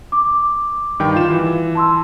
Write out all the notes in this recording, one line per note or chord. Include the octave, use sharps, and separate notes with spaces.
D6
G2 D#3 G5
F4 E7
E3
A5 C6 E6